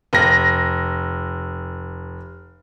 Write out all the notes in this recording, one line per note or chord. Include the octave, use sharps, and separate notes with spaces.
F1 A#6